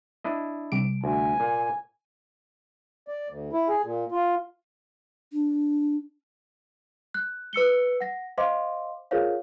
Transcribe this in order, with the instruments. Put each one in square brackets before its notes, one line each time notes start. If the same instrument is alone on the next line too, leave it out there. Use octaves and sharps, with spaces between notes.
[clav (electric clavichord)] D4 E4 D#5
[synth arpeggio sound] C3 G3 D7
[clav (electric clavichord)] D2 [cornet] G#5
[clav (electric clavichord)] A#2
[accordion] D5
D2
E4
G#4
A#2
F4
[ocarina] D4
[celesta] F#6
B4 E6 C#7 G7
F#5 A#6
C5 D#5 F5 C6 D6
F4 G#4 A#4 C5 C#5 F5